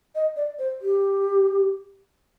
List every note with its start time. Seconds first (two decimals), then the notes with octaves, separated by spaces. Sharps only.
0.15 D#5
0.36 D5
0.59 C5
0.81 G4